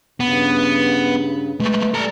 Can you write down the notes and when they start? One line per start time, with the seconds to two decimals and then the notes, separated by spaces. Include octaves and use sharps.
0.20 G2 C#3 B3
1.60 G#3 A3 B4
1.94 G3 A4 A#5